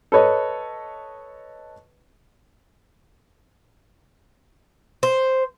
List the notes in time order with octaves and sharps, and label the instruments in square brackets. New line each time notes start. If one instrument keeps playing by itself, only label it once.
[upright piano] A4 B4 C#5 D#5
[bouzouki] C5